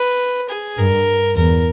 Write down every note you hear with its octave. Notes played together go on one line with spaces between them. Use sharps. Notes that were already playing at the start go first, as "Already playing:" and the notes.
Already playing: B4
G#4
G2 A#4
E2 A#4